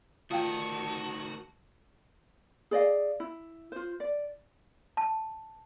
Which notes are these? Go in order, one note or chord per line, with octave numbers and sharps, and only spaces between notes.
D2 D#3 F4 F#4 F5 G5 A5
G#4 D5 D#5 F5
E4
F4 C5
D5
A5